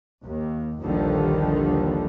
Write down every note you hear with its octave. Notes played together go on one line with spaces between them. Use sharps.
D#2
A#1 D#2 D3 D#3 F3 G3